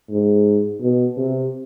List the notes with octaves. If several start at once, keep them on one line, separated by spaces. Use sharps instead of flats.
G#2
B2
C3